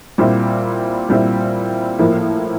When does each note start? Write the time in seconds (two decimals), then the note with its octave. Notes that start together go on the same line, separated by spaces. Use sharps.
0.18 A#2 G3 C4 E4
1.09 A#2 G3 C4 E4
1.99 A2 F3 A#3 E4